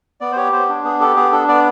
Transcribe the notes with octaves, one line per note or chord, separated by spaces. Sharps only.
B3 D5
C5
G4 C#5
B3 C5
D4
B3 G#4
G4 A4
B3 G#4
D4 A4
B3 D5